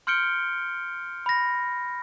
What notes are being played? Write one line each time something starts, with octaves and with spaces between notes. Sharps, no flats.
C6 F6 G6 C#7 D7 G7
B5 A#6